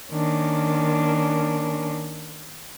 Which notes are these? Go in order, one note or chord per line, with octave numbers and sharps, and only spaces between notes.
D#3 A#3 C#4 D4